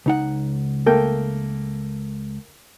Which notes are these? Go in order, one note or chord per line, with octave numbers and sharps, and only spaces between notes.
C#2 D#4 F#5
A3 A#3 G5